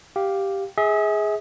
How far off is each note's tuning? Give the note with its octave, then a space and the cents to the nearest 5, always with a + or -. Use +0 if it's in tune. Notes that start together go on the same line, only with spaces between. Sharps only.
G4 +0 F5 +0
G#4 +0 E5 -40